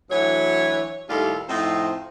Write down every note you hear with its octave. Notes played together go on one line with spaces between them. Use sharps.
D2 E3 F#3 C#5
D#2 A2 G3 F4 A4 D5
F2 A2 C4 D#4 F4 C5